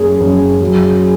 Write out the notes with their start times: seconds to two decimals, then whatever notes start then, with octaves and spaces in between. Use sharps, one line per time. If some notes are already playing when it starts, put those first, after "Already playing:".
Already playing: F#2 A#3 G#4
0.20 F#2
0.62 F#3